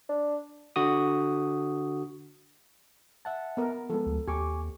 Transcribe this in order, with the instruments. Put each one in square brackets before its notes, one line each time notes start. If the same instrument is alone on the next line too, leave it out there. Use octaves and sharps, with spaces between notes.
[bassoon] D4
[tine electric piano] D3 F#4 D#6
[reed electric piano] E5 F#5 A5
[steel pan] B3 A#4
[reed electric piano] F3 G#3 B3 [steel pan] A4
[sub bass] D2
[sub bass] D#2 [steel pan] G4 [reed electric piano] G#5 C#6 D6